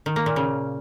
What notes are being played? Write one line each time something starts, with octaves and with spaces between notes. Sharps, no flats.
D#3
A#3
A#2
C#3